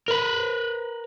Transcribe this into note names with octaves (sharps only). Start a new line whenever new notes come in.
A#4 B4